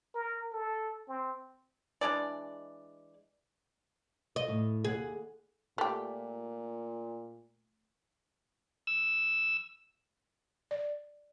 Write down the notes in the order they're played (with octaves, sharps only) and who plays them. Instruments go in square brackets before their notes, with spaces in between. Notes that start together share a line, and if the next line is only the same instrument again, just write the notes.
[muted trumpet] A#4
A4
C4
[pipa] E3 G#3 D4 D5
[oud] D#5
[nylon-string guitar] A2
[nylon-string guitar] D#2 F#5 [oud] G#4
[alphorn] A#2 [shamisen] A3 G4
[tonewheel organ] E6
[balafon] D5